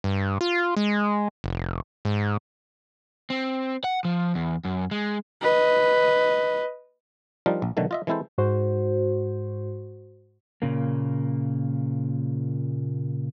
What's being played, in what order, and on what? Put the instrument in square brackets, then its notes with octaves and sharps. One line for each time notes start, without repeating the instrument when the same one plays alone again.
[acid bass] G2
F4
G#3
F1
G#2
[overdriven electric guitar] C4
F#5
F3
E2
F#2
G#3
[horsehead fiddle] B4 D#5
[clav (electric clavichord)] F3 G3 D4 D#4 F4 A#4
A#1
B2 D3 D#3 F#3 A3
F4 D#5 E5
E3 G#3 C4 E4 A4 C5
[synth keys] G#2 F#4 C5
[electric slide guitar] A#2 C#3 A#3